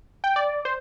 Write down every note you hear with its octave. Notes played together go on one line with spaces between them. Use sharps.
G5
D5
C5